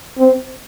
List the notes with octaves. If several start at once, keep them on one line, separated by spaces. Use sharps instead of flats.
C4